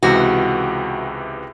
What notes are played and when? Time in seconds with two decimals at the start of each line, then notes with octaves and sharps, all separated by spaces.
0.03 C#2 C3 E3 F#4